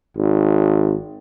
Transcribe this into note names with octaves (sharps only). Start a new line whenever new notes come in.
G#1